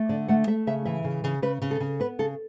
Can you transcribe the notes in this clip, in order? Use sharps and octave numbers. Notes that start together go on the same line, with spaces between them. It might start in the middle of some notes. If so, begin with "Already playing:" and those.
Already playing: A3
D3 D5
A3 F#5
A3 E5
C#3 E5
E3 E5
C#3
C#3
C#3 B4
C#3
A4
C#3
B3 B4
C#3 A4